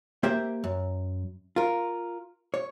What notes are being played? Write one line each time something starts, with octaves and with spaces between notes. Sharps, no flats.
A#3 G4 C5 E5 G5
F#2
F4 A#4
C#5